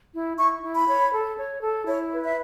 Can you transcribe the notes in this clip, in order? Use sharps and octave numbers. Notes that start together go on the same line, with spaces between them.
E4
E4 C#6
E4
B5
C#5
A4
C#5
A4
E4 C#5
B4
E5